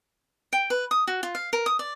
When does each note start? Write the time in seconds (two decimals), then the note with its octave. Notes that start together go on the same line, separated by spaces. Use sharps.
0.53 G5
0.70 B4
0.91 D#6
1.07 F#4
1.23 F4
1.35 F5
1.53 A#4
1.66 D#6
1.79 D5